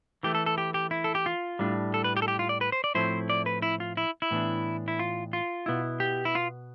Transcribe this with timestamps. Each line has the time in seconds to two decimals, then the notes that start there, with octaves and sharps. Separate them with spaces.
0.23 E3 A3 E4 G4
0.35 A4
0.46 A4
0.58 G4
0.74 G4
0.91 E4
1.04 A4
1.15 G4
1.26 F4
1.59 A2 G3 D4
1.94 A4
2.04 B4
2.17 G4
2.22 A4
2.28 G4
2.39 F4
2.49 D5
2.61 B4
2.72 C5
2.84 D5
2.95 A2 F3 A3 C4 E4 C5
3.30 D5
3.46 B4
3.62 E4
3.80 F4
3.97 E4
4.22 E4
4.31 A2 E3 B3 D4
4.88 E4
4.99 F4
5.33 F4
5.66 B2 B3 E4
6.00 G4
6.25 E4
6.35 F4